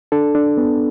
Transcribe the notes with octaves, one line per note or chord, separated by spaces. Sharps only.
D4 A4
D4
B3